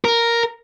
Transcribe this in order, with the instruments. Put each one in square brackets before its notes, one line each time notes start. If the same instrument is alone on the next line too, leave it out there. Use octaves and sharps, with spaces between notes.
[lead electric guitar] A#4